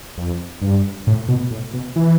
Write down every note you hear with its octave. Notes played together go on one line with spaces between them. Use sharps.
F2
G2
A2
B2
A2
B2
E3